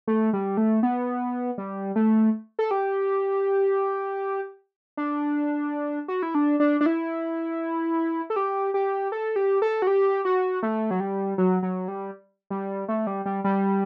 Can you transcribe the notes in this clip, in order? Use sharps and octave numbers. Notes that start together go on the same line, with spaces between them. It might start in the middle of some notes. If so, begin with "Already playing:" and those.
A3
G3
A3
B3
G3
A3
A4
G4
D4
F#4
E4
D4
D4
D4
E4
A4
G4
G4
A4
G4
A4
F#4
G4
F#4
A3
F#3
G3
F#3
F#3
G3
G3
A3
G3
G3
G3